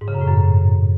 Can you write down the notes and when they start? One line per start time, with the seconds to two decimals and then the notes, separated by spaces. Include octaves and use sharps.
0.01 G#2
0.08 C#3
0.14 F#2
0.21 A2
0.28 F#2